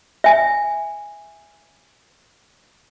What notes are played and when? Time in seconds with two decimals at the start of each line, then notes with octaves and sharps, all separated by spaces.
0.24 E5 G#5